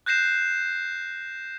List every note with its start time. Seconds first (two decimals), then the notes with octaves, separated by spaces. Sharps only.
0.06 F#6 G6 A#6 C7 E7